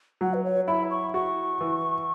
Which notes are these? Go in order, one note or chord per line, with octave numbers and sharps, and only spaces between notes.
F#3 F#5
B4
C#5
E4 B5
C#6
F#4 C#6
E3